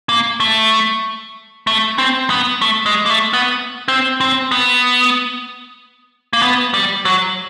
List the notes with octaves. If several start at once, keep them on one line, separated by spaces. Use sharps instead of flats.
A#3
A3
A3
C4
B3
A3
G#3
A#3
A3
B3
C4
C4
B3
A#3
B3
G3
F#3